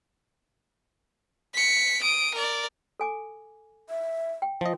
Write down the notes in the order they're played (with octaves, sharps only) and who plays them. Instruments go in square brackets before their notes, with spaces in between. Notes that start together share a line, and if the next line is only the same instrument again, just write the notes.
[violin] B6 C#7
D#6 D7
A#4 D5
[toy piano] A4 G#5 D6
[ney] E5
[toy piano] G5
[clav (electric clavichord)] F3 D#5 [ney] F4